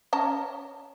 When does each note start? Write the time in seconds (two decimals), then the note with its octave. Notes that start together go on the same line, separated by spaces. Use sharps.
0.13 C#4 A5 A#5